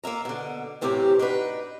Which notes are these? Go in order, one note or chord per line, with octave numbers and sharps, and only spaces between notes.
A#3 F4 E5 A#5
B2 D3
F#2 A2 C3 E3 G4 A#4
D4 D#4 F#4 B4